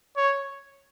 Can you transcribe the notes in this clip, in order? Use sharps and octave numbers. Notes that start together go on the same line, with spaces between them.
C#5